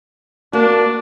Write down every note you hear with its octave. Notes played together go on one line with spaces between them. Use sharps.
A#3 D4 F#4